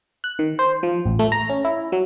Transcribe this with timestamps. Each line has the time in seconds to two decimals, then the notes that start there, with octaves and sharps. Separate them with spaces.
0.24 F#6
0.39 D#3
0.59 C5
0.83 F3
1.06 A1
1.19 A3
1.32 A#5
1.49 C#4
1.65 E4
1.92 F#3